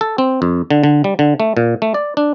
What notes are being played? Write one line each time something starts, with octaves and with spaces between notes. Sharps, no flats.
A4
C4
F2
D3
D3
G3
D3
A3
A#2
A3
D5
D4